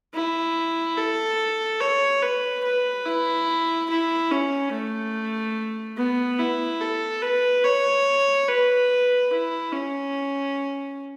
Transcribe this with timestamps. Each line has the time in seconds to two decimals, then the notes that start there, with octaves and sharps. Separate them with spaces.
0.14 E4
0.98 A4
1.81 C#5
2.23 B4
2.64 B4
3.06 E4
3.90 E4
4.31 C#4
4.72 A3
5.97 B3
6.39 E4
6.81 A4
7.22 B4
7.64 C#5
8.48 B4
9.31 E4
9.72 C#4